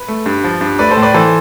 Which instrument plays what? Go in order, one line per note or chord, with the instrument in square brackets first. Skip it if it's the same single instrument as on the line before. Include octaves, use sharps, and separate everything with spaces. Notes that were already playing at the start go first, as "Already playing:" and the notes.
Already playing: [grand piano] B4
A3
G2
F3
G2
A3 B4 D5
A4 C5
A2
B4 D5
E3 A4 C5